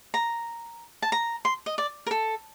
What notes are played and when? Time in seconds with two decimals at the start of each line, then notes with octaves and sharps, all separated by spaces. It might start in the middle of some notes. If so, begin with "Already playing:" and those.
0.14 A#5
1.02 A5
1.12 A#5
1.45 C6
1.66 D#5
1.78 D5
2.06 A#4
2.11 A4